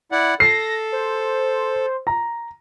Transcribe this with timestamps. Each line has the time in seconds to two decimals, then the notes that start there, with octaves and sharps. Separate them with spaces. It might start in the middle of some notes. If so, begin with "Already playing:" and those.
0.12 E4 D5 F#5
0.40 A4 A#6 C7
0.92 C5
2.07 A#5